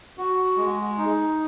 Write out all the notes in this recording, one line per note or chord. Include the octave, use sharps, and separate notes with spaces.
F#4
G#3
D#4